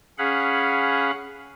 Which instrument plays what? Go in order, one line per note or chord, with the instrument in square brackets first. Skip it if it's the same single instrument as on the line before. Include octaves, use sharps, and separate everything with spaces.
[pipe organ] C#4 G#4 F5 F#5 B5